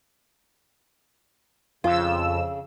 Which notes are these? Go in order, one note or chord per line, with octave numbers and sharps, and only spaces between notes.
F2 C#3 F4 E6